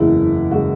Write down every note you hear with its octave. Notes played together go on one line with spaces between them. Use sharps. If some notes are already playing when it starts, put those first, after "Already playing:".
Already playing: F#1 E2 C#3 G#3 E4
C#3 G#3 F#4